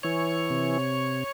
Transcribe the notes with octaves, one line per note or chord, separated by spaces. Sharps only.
E3 C#5
C3